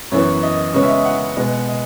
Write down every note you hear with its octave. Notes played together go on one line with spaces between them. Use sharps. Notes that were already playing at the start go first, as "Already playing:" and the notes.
F#2 E3 B3 C#5
D#5
C#3 G#3 B3 C#5
E5
D#5
F#5
B2 G#3 B3
D#5